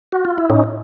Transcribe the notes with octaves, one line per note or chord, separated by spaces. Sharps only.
F#4
F4
E4
A2 C#4 D#4